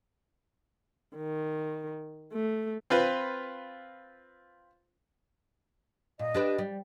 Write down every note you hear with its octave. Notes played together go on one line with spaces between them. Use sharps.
D#3
A3
C4 F4 B4
A#2 D#5
D4 G4 B4
G3